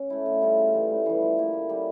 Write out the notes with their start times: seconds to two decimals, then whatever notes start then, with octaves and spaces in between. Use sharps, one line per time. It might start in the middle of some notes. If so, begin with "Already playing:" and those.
Already playing: C#4
0.10 A3 E4
0.26 D3
0.42 G3 C#4 F4
0.58 C#3
0.73 E3 G3
0.89 A2
1.06 E3 G3
1.22 F3
1.38 A#3 E4
1.53 D3
1.69 G3 C#4